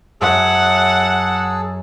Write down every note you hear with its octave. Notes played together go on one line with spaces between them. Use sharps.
F#2 G#4 C#5 F#5 A5 E6